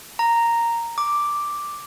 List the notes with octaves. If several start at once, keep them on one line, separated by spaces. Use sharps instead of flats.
A#5
D6